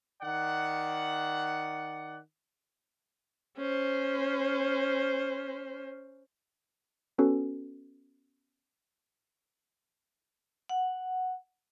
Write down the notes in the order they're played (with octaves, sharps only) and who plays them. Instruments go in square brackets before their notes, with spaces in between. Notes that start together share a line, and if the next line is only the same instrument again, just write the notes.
[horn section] D#3 D5 F#5
[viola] C#4 C5
[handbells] B3 C#4 F#4 A4 B4
[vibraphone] F#5